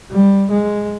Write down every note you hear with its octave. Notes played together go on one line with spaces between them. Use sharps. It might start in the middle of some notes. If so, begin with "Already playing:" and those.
G3
G#3